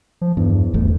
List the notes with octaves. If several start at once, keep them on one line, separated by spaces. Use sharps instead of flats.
F3
E2 G2
D#1 G#1 E2 A3